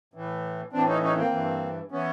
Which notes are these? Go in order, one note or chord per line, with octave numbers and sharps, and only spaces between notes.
A2 E3
A2 E3 C4 D4
C#4 D#4
C#4 D#4
A#3 C4
G2 E3
E3 B3 C#4